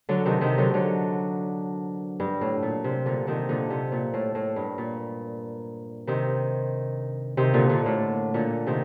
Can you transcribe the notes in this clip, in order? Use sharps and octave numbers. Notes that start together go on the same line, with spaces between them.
D3 F#3
C3 D#3
C3 D#3
D3 F#3
D3 F#3
G2
A2
A#2
C3
A#2 D3
C3 D#3
A#2 D3
C3
A#2
A2
A2
G2
A#2
C3 D#3
C3 D#3
A#2 D3
A#2 D3
A2
A#2 D3
C3 D#3